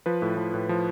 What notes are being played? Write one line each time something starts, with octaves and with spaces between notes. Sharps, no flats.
F3 B4
A2
F3
A2
F3